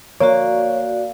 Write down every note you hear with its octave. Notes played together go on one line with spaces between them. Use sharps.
A#3 F#4 C#5 D5